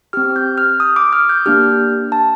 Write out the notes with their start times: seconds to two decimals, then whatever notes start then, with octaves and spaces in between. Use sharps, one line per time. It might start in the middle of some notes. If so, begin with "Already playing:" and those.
0.13 C4 G4 F6
0.36 G6
0.58 F6
0.80 D#6
0.96 D6
1.13 F6
1.29 G6
1.46 A#3 D4 G4 F6
2.12 A5